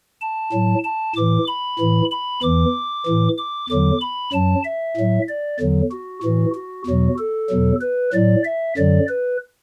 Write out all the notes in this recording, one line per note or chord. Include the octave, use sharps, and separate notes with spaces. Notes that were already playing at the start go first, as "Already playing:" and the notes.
A5
A2 F#3
A5
A2 E3 D6
B5
A2 E3
B5
E2 E3 D6
A2 E3
D6
E2 D3 F#3 D6
B5
F#2 F#3 A5
E5
A2 F#3
D5
E2 D3 F#3
F#4
A2 E3 F#4
F#4
E2 B2 F#3 F#4
A4
E2 B2 F#3
B4
A2 F#3 D5
E5
F#2 D3 F#3 D5
B4